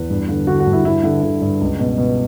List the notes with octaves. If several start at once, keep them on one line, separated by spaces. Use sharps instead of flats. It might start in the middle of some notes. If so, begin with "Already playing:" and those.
Already playing: E2 B4
G2
D3
D3 F#4
F#4
G2
E4
G2 E4
D3
D3
G2
C#2
B2
B2